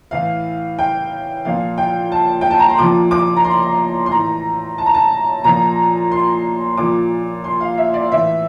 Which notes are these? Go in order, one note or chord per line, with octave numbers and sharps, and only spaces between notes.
A2 E3 F5
G5
A#2 F3 F5
G5
A5
G5
A5
A#5
C6
A#2 F3 D6
D6
A#5
C6
C6
A2 E3 A#5
A5
A#5
A5
A#2 F3 A#5
C6
A#2 F3 D6
C6
F5
E5
D5
A2 E3 E5